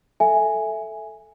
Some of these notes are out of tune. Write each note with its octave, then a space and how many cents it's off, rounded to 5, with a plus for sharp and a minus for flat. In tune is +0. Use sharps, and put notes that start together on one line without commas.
A4 +0 E5 +0 G#5 +0